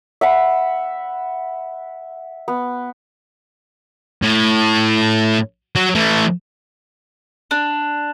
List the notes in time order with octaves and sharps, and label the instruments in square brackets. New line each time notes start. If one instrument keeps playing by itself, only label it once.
[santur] E5 F#5 B5
B3
[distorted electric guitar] A2
F#3
E3 A3
[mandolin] D4